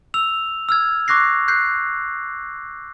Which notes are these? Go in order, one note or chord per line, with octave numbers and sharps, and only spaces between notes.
E6 F7
E6 F6 G#6
C#6 D6 F#6 A#6 C7
F#6 G6 C7